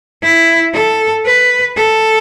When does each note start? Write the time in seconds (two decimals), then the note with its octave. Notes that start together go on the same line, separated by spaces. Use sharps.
0.23 E4
0.74 A4
1.25 B4
1.77 A4